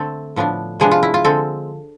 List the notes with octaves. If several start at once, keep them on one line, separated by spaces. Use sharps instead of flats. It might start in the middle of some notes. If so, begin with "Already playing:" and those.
Already playing: D3 A3 C4 A4
A2 F3 B3 D4
C3 F3 G#3 B3 D4 G#4
F4
E4
F4
D3 G#3 C4 A4